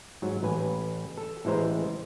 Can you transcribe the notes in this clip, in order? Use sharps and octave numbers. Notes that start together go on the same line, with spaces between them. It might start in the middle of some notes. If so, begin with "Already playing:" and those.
G#2 F#3
A1 B4 G#5
A4
A1 E3 G#3 C5 A#5